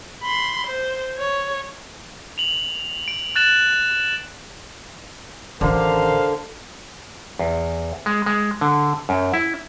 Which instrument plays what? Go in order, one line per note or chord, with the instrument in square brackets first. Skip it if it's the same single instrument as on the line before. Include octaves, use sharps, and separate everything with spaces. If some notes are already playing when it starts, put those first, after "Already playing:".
[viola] B5 C6
C5
C#5
[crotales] F7 F#7
D7
F#6 A6 E7 F#7
[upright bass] A1 D#3 [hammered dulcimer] D3 [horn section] A#4 C5 F5
[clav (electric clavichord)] E2
G#3
G#3
D3
F#2
E4